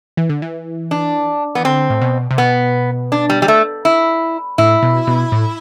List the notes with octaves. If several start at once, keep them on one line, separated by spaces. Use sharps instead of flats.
E3
D3
E3
D4
E3 B3
D3 C4
A2
B2
C3
B2 B3
D4
G3
G3
A3
E4
A2 E4
B2
B2
A2